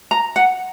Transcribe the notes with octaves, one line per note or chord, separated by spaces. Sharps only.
A#5
F#5